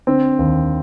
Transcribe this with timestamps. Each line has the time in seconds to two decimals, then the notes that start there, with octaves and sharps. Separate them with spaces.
0.07 D3 C4
0.39 D#2